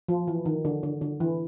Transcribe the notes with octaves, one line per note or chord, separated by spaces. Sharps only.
F3
E3
D#3
D3
D3
D3
E3